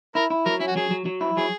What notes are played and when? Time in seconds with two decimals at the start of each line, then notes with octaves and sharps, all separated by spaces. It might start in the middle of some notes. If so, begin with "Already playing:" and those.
0.15 E4 A#4
0.30 E4
0.46 F#3 A#4
0.60 C#4 E4
0.67 F#4
0.76 F#3 G#4
0.91 F#3
1.06 F#3
1.21 E4
1.37 F#3 G#4